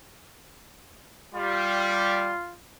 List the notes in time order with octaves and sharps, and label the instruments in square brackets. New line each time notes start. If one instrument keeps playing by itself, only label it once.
[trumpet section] G3 [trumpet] F4